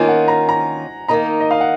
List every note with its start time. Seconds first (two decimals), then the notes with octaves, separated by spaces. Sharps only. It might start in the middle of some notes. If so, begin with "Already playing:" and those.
Already playing: D#3 A#3 C#4 F4 G#5
0.08 F#5
0.28 A#5
0.49 A#5
1.08 D#3 A#3 D#4 A#5
1.40 D#5
1.51 F5
1.61 F#5